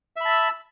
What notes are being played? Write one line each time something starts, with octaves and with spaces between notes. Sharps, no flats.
E5 A5 B5 E6